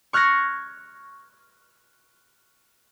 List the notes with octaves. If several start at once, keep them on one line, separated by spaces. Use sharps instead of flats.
C#6 F6 F#6 G#6 A#6 C#7